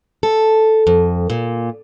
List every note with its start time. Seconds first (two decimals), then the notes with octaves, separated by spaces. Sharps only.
0.23 A4
0.87 F2
1.30 A#2